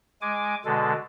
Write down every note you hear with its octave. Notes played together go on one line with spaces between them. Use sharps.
G#3 G#5 D6
B2 D3 G#3 A4